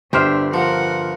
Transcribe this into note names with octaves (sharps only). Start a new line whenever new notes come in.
G1 D4 G4 C5 E5 C6 F6
F3 A#4 F#5